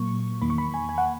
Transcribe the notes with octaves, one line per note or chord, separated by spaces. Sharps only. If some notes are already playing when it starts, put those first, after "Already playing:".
Already playing: A#2 F#3 A#3 C#6
E2 D#3 A#3 B5
C#6
B5
G#5
G#5
F#5